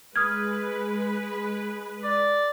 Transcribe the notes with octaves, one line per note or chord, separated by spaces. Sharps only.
G#3 B4 D#6 F6 G#6
D5